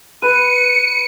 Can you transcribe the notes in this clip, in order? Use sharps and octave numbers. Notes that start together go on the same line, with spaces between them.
B4 C#7 D#7